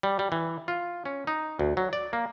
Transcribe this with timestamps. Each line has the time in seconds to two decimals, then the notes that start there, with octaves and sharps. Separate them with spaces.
0.03 G3
0.19 G3
0.32 E3
0.68 F4
1.05 C#4
1.27 D#4
1.59 D2
1.77 F#3
1.93 D5
2.13 A#3